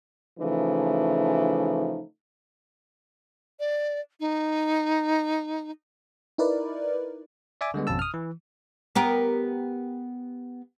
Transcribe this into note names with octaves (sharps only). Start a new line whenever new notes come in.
C#3 E3 F3 A3 D#4
D5
D#4
D#4 E4 A#4 B4 D5
D5 E5 G#5 D6
D3 G3 G#3 B3
G#1 F2 B2 C#4 A5 E6
D#6 F6
E3
B3 G4 A#4